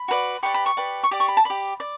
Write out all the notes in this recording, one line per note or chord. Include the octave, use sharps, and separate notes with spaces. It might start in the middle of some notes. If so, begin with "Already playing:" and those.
Already playing: B5
F#4 B4 D5
G4 B4 D5 C#6
B5
C#6
G4 B4 D5
C#6
G4 D5 D6
C#6
B5
A5
G4 D5 B5
D5